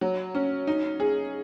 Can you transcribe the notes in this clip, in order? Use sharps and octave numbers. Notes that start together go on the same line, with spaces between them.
F#3
C#4
D#4
G#4